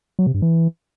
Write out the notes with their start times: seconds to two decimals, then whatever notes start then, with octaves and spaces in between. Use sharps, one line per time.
0.19 F#3
0.27 C3
0.34 G2
0.42 E3